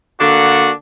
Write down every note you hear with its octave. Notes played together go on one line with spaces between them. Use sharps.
D3 A#3 D4 F#4